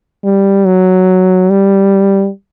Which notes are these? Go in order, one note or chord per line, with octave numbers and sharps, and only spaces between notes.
G3
F#3
G3